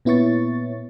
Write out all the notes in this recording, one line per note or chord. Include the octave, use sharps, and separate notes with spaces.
A#2 B3 E4 C#5 C#6 A6